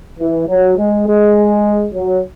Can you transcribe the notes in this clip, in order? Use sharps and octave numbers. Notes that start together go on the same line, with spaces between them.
E3
F#3
G#3
G#3
F#3